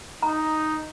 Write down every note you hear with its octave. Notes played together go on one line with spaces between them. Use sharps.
D#4 A#5